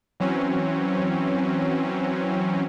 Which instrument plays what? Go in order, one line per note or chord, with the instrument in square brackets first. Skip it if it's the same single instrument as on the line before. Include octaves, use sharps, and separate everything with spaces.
[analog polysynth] E3 F#3 C4 C#4